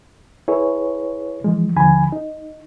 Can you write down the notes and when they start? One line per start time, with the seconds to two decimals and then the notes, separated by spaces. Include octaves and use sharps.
0.48 E4 G#4 B4 C#5
1.44 E3 F3 G#3
1.76 D#2 D3 F3 G#5 B5
2.12 D#4